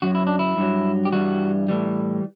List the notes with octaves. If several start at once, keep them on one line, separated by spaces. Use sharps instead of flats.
F#2 F#3 F#4
E4
D4
E4
G2 F#3
G4
G2 E3 G3 F#4
A2 E3 G3